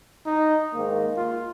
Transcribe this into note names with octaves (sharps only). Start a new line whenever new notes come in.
D#4
G#2 D#3 A#3
F4